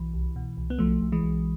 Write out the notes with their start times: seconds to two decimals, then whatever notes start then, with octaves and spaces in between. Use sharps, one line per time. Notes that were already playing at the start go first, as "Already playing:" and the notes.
Already playing: B1 E3
0.14 C2
0.36 B2
0.57 C2
0.70 B3
0.79 B1 F3 A3
1.01 B1
1.12 E3 G#3
1.23 B1